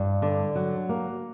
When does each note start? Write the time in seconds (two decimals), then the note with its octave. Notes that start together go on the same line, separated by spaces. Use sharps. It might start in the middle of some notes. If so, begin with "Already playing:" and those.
Already playing: G2
0.22 D3
0.56 F#3
0.89 A#3